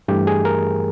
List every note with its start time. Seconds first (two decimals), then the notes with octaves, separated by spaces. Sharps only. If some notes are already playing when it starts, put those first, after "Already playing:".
0.08 G2 E3 A3 G4
0.27 G#4
0.45 A#4